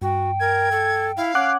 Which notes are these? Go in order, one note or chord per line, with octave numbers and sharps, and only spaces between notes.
G2 F#4 G5
A#4 G#6
A4
E4 F5
C#4 F#5 D6 F#6